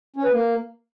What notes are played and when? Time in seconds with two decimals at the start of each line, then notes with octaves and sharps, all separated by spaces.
0.16 C#4
0.24 B4
0.32 A#3